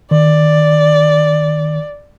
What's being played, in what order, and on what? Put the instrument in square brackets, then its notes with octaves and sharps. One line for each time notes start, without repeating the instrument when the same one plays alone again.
[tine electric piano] D#3 [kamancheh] D5